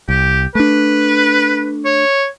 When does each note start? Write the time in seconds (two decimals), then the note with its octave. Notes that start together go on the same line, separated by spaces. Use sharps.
0.09 C2 G4
0.55 A3 D4 B4
1.85 C#5